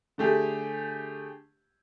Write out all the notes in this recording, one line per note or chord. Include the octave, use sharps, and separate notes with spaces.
D3 A3 G4 G#4